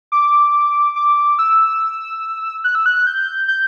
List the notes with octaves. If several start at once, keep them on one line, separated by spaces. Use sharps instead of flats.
D6
D6
E6
F#6
E6
F#6
F#6
G6
G6